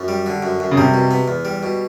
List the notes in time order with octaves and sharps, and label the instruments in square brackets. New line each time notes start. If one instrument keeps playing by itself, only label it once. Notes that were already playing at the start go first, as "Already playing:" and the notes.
Already playing: [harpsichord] F#2
G3
D3
F#2
F#2
[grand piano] C#3
[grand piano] C3 [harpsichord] G3
[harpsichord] B2
B3
E2
G3
B2